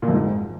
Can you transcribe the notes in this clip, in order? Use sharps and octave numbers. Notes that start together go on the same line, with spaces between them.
A#2
F2
G#2